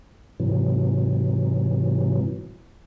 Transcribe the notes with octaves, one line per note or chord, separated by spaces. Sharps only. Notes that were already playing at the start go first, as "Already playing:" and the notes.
G#2 C3 E3 F#3